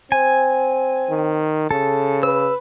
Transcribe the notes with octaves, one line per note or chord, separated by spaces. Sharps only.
C4 G#5
D#3
C#3 A4
B4 E6